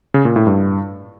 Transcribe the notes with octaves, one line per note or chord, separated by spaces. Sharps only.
C#3
A#2
A2
G2